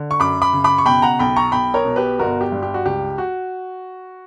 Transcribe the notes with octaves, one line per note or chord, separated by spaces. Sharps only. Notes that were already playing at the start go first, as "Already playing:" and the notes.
Already playing: D3
C#6
F#2 B5 D6
B5 D6
C#3
B5 D6
C#6
B2 G5 B5
F#5 A#5
B1 G5 B5
A#5 C#6
B1 G5 B5
A#4 C#5
B2
G4 B4
G1 F#4 A#4
G4
G2
G4
F#4
C#2 G4
F#4